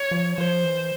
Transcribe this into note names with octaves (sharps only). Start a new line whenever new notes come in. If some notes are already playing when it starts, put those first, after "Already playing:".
Already playing: C#5
F3
F3 C5
E3